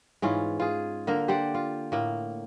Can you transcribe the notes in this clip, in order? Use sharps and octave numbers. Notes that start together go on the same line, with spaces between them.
G#2 E3 C#4 F4
F4 G#4
D3 A#3 A#4
G4 C5 D5 F#5
F4
A2 A#3